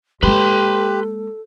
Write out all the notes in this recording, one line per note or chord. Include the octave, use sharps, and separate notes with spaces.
G#3 A#3 G4 A4 B4 C6